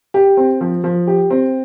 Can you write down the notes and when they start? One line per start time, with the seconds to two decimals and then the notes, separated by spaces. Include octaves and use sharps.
0.14 G4
0.37 C4
0.61 F3
0.84 F3
1.07 G4
1.30 C4